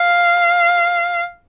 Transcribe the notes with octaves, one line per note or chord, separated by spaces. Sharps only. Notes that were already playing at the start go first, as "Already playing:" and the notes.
Already playing: F5